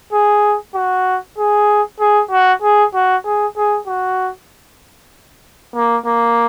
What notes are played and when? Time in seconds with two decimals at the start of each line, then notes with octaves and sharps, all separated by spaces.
0.13 G#4
0.75 F#4
1.38 G#4
2.00 G#4
2.31 F#4
2.62 G#4
2.95 F#4
3.25 G#4
3.57 G#4
3.87 F#4
5.75 A#3
6.06 A#3